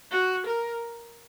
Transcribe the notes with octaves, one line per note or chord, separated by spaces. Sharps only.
F#4
A#4